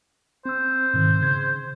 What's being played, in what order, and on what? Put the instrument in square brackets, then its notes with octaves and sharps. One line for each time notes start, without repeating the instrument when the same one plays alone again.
[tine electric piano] C4 E6 [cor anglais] C5
[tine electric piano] G#2 B2 D#3
C#3 G#6